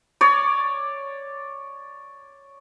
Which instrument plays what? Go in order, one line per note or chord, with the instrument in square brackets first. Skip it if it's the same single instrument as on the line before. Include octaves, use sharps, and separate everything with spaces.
[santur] C#5 D5